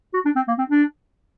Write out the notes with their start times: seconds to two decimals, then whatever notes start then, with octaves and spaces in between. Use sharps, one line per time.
0.14 F#4
0.25 D4
0.36 C4
0.48 A#3
0.59 C4
0.70 D4